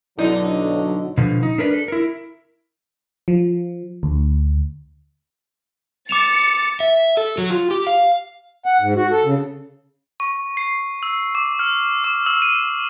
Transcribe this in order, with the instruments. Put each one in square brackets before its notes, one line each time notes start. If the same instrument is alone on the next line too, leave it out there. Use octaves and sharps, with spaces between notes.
[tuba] B1 [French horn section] D3 F#3 [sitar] D#4 [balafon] E4 D5
[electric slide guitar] B2 D3 F3
D#4
D4 A#4 B4 C#5 D5
A4
E4 A#4
[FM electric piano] F3
D2
[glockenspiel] D6 E7 F7 [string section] A6 C#7
[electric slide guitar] E5
A4
F#3
F4
G4
F5
[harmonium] F#5
G#2
F#4
A4
C#3
[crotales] C#6
C7
E6
D6
F6
D6
E6
D#7